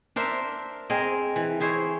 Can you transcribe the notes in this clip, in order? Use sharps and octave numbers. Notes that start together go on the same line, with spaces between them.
D4 A#4 C5 E5
C4 G#4 A#4 D#5
E3
E4 G#4 C5 C#5